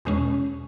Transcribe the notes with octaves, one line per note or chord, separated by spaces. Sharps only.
E2 B2 G#3 C#4